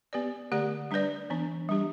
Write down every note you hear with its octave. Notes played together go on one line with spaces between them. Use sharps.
B3 G4 B4 D5
D3 A3 G4 D5
G3 D4 B4 D5
E3 B3 D4
G3 D4 G4